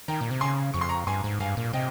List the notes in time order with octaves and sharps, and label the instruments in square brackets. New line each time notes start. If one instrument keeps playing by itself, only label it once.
[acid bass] D#3 [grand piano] G5 A#5
[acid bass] A#2
C3
[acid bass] C#3 [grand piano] G#5 C6
[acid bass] F2 [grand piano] C#6
[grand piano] C6
A#5 C#6
[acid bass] G2 [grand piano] G#5 C6
[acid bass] G#2
[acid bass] G2 [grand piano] F5 G#5
[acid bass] A#2
[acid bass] C3 [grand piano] D#5 G5